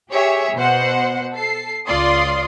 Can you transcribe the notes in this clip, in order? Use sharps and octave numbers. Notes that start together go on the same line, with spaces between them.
G4 G#4 C#5 E5
B2 C5 F#5
A4 C7
C#2 F4 D5 C6 D#6